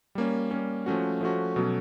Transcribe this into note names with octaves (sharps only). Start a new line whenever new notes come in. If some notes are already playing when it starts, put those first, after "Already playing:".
G3 A#3 C#4
G3 A#3 C#4
F3 A3 C#4 F#4
F3 A3 C#4 F#4
B2 F#3 A3 C#4